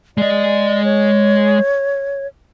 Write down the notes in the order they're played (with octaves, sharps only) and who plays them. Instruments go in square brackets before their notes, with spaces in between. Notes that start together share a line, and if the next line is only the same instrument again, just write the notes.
[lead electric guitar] G#3 D#5 [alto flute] D5
[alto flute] C#5